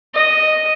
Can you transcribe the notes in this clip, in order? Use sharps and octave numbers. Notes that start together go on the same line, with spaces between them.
D#5